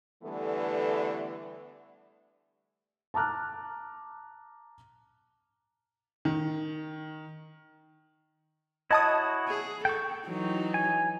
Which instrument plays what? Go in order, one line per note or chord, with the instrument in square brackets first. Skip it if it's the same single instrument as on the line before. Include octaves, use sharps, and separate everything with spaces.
[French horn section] D3 E3 G3 A3 B3
[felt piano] A5 A#5 D6 F6 F#6
[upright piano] D#3
[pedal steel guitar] E4 F#4 C#5 [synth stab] D#5 A5 D#6
[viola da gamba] G#4
[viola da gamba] A4 [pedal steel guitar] G5 C#6
[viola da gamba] E3 F#3 D#4
[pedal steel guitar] G#5